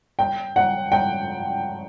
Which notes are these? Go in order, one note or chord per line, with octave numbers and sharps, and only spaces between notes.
G5
F#5
G5